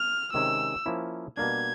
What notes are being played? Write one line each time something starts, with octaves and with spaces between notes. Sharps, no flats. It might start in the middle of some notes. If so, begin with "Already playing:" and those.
Already playing: F6
C3 D#3 G#3 C#4 E6
F3 A#3 C#4 E4
B2 G3 A#3 D4 G#6